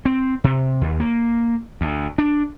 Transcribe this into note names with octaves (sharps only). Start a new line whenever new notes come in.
C4
C3
D#2
A#3
D2
D4